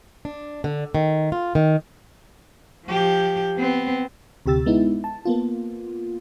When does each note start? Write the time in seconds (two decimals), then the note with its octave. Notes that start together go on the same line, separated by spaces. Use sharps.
0.25 D4
0.64 D3
0.95 D#3
1.32 F4
1.55 D#3
2.87 F3 G4
3.57 B3 C4
4.46 D2 C3 G4 E6 A6
4.66 G#3 B3 D#4 E4
5.04 A5
5.25 A#3 B3 F4